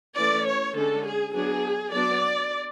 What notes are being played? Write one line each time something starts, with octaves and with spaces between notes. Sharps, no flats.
E3 A3 C#4 D5
C#5
D3 G#3 C#4 A4
G#4
F#3 B3 D4 G#4
F#3 B3 D4 D5